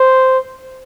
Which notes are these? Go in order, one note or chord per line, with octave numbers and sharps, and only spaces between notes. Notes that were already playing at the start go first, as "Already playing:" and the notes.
Already playing: C5